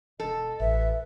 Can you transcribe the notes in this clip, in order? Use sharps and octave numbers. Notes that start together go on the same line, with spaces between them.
E1 A4 D#5
A1 B4 E5